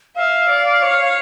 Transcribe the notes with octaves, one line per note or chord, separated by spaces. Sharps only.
E5 F5
D5
C#5